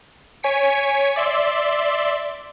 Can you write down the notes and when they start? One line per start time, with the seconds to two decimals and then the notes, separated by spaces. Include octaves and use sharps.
0.43 C#5 G#5 B6 C#7 D7
1.16 D5 E5 C6